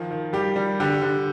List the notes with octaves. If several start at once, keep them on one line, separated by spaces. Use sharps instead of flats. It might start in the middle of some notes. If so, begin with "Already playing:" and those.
Already playing: D#3 F3
D#3
G3 G4
G3
D3 G4
D3